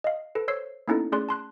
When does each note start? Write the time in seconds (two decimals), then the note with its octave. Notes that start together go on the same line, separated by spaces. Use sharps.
0.04 D#5 F5
0.35 A4 B4
0.48 C5 C#5 E6 C7
0.88 A#3 B3 C#4 D#4 E4 A4
1.12 A3 C#4 G#4 D5 C6 F#6
1.29 A5 C6 F#6